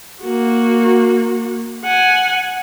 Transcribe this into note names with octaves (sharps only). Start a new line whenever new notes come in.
A#3 F#4
F#5 G#5